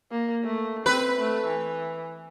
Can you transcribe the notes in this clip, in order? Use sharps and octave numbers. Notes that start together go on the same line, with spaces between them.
A#3
A3
C4 B4
A3
E3